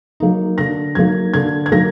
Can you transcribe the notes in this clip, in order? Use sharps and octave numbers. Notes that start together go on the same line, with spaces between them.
F#3 A#3 D#4
D3 A#6
F#3 A#3 D#4 G#6
D3 G#6
G#6
F#3 A#3 D#4 A#6